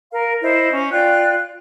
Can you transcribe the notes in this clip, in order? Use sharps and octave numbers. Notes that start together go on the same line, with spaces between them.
A#4 F5
E4 C5 D#5
C#4
F4 D5 G5 F#6